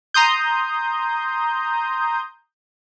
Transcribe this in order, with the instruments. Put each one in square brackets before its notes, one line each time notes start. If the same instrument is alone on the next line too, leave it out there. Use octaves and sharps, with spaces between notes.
[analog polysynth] A#5 C6 D#6 G6